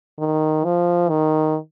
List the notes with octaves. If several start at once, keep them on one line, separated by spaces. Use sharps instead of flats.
D#3
F3
D#3